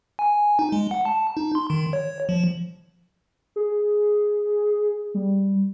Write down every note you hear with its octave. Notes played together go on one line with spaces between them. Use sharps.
G#5
D#4
G#3
F#5
A5
D#4
C6
D#3
C#5
F3
G#4
G3